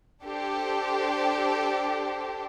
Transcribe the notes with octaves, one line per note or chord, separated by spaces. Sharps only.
D4 G4 A4 C5